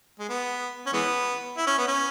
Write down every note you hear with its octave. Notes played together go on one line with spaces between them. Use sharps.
G#3
B3
C#4
E3 G#3 B3
E4
C#4
B3
C#4